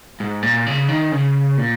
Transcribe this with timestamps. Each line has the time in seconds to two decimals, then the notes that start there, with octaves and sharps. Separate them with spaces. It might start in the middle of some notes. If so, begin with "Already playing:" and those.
0.20 G#2
0.43 A#2
0.67 C#3
0.88 D#3
1.12 C#3
1.58 A#2